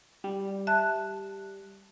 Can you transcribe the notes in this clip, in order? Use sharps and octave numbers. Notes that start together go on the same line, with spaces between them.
G3
E5 A5 F#6